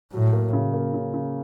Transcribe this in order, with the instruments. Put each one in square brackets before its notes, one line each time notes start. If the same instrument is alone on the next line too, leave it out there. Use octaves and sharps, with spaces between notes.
[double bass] A2 [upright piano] F#3
[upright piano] A#3
C#3
A#3
C#3
C#3